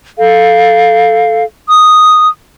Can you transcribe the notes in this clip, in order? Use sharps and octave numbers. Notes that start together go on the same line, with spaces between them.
A4 F5
D#6